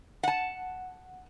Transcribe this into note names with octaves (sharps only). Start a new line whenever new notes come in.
F#5 A5